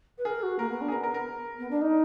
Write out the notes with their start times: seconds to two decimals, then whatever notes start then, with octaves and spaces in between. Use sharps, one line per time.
0.18 B4
0.25 G#4 A#4
0.42 F#4
0.59 A#3 A#4
0.70 B3
0.81 D4
0.88 G#4
0.92 B3 A#4
1.03 A#4
1.14 A#4
1.59 B3
1.71 D4
1.82 D#4